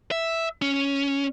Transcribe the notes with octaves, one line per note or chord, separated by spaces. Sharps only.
E5
C#4